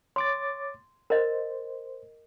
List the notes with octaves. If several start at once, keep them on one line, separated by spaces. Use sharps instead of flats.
C#5 C6 D6 A6
A#4 C5 D#5